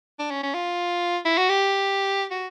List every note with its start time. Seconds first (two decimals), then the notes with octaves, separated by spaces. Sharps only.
0.19 D4
0.31 C#4
0.43 C#4
0.54 F4
1.25 E4
1.38 F#4
1.49 G4
2.31 F#4